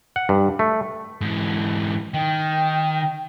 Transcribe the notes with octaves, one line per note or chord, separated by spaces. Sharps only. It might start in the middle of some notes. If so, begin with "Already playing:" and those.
F#5
G2
A3
G#2 E3
D#3 G5